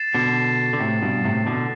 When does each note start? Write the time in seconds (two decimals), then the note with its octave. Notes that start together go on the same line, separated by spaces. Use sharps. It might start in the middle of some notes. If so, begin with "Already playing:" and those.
Already playing: A6 C7 E7
0.15 B2 D3
0.73 D3
0.80 A2 C3
1.02 G2 B2
1.24 A2 C3
1.46 B2 D3